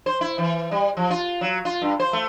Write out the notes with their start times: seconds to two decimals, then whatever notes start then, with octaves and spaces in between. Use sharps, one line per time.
0.06 C5
0.21 E4
0.38 E3
0.71 G3
0.97 F3
1.10 F4
1.41 F#3
1.65 F4
1.82 G2
2.00 C5
2.13 A3